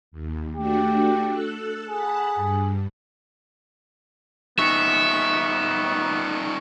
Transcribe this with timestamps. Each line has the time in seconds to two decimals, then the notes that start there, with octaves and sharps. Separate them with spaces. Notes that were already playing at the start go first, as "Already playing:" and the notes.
0.12 D#2
0.56 A3 D4 F#4 G4
1.28 A4 E6 F#6
1.90 G#4 F#5 A5 B5
2.35 G2
4.59 G3 B3 D#4 E5 C#6 C#7